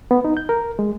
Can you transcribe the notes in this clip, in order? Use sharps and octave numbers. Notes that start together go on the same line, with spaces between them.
B3
D#4
G6
A#4
G#3